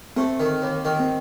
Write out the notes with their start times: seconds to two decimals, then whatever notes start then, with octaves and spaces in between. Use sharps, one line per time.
0.16 A3 C4
0.40 D#3
0.62 D#2
0.85 D#3
0.99 C4